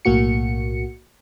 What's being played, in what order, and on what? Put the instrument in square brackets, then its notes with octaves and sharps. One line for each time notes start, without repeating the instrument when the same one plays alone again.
[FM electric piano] B1 A2 A#3 F#4 C#7